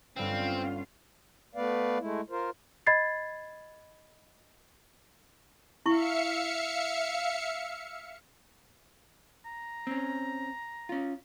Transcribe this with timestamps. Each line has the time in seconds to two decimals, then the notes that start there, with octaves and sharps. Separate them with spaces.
0.17 G1 C4 C#4 F4 F5 F#5
1.55 A3 B3 B4 D5 F5
1.99 G#3 A3 E4
2.30 F4 A#4 C5
2.87 D#5 B5 G#6 A6 C7
5.86 E4 E5 F5 C#6 C#7
9.45 A#5
9.87 C4 C#4
10.89 C#4 F4